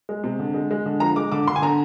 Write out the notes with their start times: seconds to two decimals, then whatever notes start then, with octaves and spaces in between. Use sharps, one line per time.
0.09 G#3
0.24 C3
0.39 D3
0.54 G#3
0.71 G#3
0.86 D3
1.00 F3 A#5
1.16 G#3 D6
1.32 D3 D6
1.47 D3 C6
1.56 G#5
1.62 D3 A#5